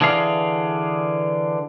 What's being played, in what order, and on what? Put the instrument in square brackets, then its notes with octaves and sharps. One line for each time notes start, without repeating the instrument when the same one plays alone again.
[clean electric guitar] D3 E3 G#4 D5 F5